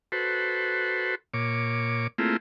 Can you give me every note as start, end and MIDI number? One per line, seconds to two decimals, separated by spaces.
0.12 1.15 66
0.12 1.15 69
0.12 1.15 71
0.12 1.15 72
1.34 2.07 46
1.34 2.07 73
1.34 2.07 86
2.18 2.37 57
2.18 2.37 58
2.18 2.37 60
2.18 2.37 64
2.18 2.37 65
2.18 2.37 68